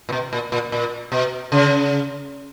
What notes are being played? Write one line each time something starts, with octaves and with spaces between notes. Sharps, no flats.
A#2
B2
A#2
A#2
A#2
B2
C#3